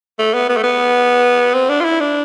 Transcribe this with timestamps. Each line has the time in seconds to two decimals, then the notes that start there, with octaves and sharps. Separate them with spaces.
0.19 A3
0.34 B3
0.49 B3
0.57 A3
0.64 B3
1.54 C4
1.69 D4
1.80 F4
1.84 E4
2.00 D4